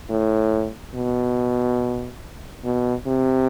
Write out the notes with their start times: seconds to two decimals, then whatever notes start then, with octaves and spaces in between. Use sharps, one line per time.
0.10 A2
0.95 B2
2.64 B2
3.07 C3